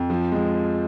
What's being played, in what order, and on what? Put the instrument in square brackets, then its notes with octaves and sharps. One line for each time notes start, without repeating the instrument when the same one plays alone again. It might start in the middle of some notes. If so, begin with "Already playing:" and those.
Already playing: [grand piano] F2
F3
G#3